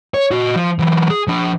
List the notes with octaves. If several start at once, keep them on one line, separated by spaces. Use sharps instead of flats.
C#5
F#4 D#5
F3
E3 F#3
G#4
F3 D4